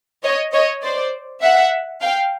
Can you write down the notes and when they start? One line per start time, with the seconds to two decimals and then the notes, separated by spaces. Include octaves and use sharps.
0.23 C#5 D#5
0.53 C#5 D#5
0.83 C5 D5
1.42 E5 F#5
2.01 F5 G5